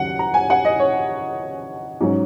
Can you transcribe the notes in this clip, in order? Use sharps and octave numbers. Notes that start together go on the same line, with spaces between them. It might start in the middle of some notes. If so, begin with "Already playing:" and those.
Already playing: D#2 C#3 F#3 F#5
A#5
G#5
F#5
D#5
C#5
G#2 F#3 C#4